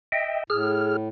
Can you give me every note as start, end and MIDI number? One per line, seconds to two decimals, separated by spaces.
0.12 0.44 75
0.12 0.44 76
0.12 0.44 79
0.50 1.08 45
0.50 0.96 68
0.50 0.96 89